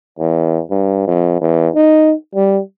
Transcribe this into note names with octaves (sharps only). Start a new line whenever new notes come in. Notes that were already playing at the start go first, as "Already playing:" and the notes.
E2
G2
F2
E2
D#4
G3